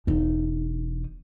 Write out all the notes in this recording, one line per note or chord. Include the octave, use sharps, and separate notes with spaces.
E1 D#4